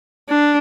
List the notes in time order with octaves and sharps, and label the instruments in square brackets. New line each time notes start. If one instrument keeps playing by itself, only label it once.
[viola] D4